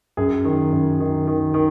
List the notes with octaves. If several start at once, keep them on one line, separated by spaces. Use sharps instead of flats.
F#2 G#4
D#3
F#2
D#3
D#3
D#3